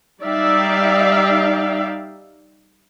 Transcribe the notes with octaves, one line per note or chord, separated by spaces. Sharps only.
G3 D#4 D5 E5 F5 G5